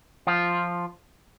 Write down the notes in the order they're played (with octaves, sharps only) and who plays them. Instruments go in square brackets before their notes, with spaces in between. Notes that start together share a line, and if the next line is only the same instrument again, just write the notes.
[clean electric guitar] F3 F4